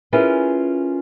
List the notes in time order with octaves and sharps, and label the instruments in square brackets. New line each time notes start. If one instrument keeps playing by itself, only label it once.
[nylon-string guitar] C#4 E4 F4 G#4 A#4 B4